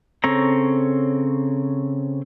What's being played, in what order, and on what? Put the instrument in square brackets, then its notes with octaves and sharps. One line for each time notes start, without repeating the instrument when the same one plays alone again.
[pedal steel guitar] C#3 C4 A4 C#5 A#5